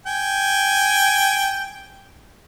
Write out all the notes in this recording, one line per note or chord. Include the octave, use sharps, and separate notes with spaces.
G5 G#5